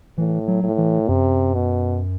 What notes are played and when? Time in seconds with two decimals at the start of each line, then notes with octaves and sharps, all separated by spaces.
0.18 A2 E3
0.48 F#3
0.64 A2
0.78 E3
1.09 F#2 C3
1.54 B2